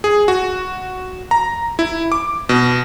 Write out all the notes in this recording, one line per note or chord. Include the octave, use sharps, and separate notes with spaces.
G#4
F#4
A#5
E4
D6
B2